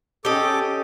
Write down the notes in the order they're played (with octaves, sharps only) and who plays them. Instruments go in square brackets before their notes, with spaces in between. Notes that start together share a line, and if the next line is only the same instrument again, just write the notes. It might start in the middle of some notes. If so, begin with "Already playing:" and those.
[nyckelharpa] C#4 G5 [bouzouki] G4 D#5 [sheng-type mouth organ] A4 D6